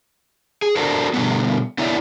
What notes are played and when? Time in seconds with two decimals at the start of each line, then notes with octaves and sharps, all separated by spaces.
0.62 G#4
0.76 D4 F#4 A4 A#4 C5
1.14 B2 D3 G3 A3 B3 C4
1.78 B3 D#4 E4 C#5 D5 E5